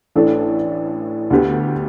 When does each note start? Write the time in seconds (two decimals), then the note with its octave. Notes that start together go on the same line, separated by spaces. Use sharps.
0.15 A1 A2 A3 D4 A4
1.30 D2 D3 B3 G4